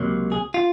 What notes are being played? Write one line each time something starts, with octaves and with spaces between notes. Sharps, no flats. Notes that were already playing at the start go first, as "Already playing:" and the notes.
Already playing: C#2 C3 F#3 A#3
G#4
F4